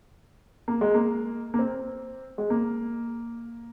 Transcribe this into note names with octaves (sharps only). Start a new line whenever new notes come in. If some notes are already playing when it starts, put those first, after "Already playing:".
A#3
G#3
A#3
A#3
C4
G#3
A#3